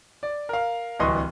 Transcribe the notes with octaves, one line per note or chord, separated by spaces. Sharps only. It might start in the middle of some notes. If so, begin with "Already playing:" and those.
D5
A#4 F5
D1 C2 E3 D#5 C6 C#6